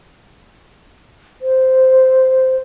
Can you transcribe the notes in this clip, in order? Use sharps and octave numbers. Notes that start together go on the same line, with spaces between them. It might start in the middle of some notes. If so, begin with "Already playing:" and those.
C5